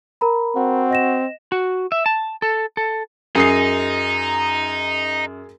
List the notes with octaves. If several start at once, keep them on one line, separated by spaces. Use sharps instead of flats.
A#4 A#5 B5
C4 F#4
D#5 A#6 E7
F#4
E5
A5
A4
A4
F#2 D#4 G#4 D#6 C7